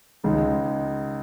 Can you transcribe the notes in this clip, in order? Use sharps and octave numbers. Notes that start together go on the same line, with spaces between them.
C#2 C#3 G#3 D#4